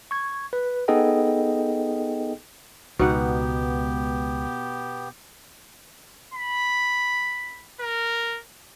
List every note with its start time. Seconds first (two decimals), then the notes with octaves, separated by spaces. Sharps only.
0.11 C#6 G#6
0.53 B4
0.88 B3 D#4 G#4 A4 D#5 G5
2.99 C#2 B2 G#3 B3 D#4 G4 F#5
6.34 B5
7.81 A#4